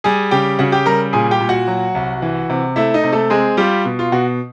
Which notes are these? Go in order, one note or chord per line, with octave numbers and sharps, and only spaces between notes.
G3 G#4 G#5
C#3 G4 G5
C#3 F#4 F#5
G4 G5
G3 A#4 A#5
A#2 G#4 G#5
G4 G5
A#2
F#4 F#5
F#3
C2
E3
C3
A3 E4 E5
D#4 D#5
C3
A3 A4
G#3 C4 G#4
G3 F4 G4
B2
F4
B2 F#4